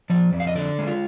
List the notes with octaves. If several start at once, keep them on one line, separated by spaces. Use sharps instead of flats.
F3 D5
F2
F5
D#5
D3 D5
G#3
F4